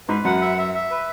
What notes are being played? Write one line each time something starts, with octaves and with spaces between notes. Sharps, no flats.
G#2 B4
F#2 F#5
E5
E5
E5
B4